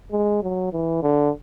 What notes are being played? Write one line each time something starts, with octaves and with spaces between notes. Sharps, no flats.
G#3
F#3
E3
D3